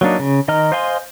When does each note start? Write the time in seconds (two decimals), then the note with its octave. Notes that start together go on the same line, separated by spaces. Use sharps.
0.01 F#3 A#3 D4 D#4
0.19 C#3
0.48 D#3 D#5 A#5 F6
0.72 C5 D#5 F5 G#5 C6